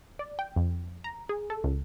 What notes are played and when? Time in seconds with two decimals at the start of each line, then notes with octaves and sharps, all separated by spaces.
0.19 D5
0.39 G5
0.56 F2
1.04 A#5
1.29 G#4
1.50 A4
1.64 C#2